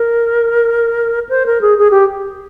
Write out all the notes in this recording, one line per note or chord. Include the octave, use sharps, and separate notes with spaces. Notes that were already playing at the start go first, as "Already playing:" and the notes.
Already playing: A#4
C5
A#4
G#4
G#4
G4